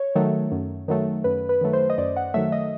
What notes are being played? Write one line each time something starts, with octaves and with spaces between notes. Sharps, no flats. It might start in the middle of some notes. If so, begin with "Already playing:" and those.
Already playing: C#5
D#3 F#3 A3
F#2
D#3 F#3 A3
F#2 B4
B4
D#3 F#3 A3
C5
D#5
F#2 D5
F#5
D#3 F#3 A3 E5
D#5